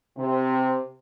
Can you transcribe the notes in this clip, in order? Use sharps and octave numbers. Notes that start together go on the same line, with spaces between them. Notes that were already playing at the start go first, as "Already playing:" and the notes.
C3